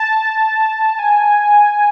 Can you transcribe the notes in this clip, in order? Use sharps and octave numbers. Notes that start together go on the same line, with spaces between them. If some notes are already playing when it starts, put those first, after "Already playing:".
Already playing: A5
G#5